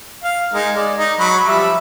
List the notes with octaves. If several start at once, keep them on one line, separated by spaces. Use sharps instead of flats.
F5
G#3 D#4 A#4
G#3 D5
D#4
F#3 B5
F3 G3 E5